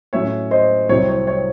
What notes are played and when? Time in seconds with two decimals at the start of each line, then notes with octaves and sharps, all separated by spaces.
0.13 A2 F#3 C#4 C#5 E5
0.51 C5 D#5
0.89 C2 C3 F#3 C4 E4 C#5
1.09 C#5
1.27 C#5